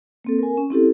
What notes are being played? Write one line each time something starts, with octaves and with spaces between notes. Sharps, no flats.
A#3 C4 A4
A#4 G#5
C#4
C4 E4 G4 A4